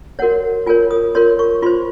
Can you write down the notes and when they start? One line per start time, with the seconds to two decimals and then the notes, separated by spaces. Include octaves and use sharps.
0.19 F#4 A#4 C#5 F#5
0.66 F4 A#4 C#5 G#5
0.91 D#6
1.15 F4 A#4 C#5 C6
1.39 C#6
1.62 F4 C5 C6